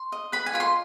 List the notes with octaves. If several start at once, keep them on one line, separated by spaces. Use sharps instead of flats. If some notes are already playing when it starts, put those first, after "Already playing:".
Already playing: C6
D#5
B4 B5
G#5
F4 B5
C6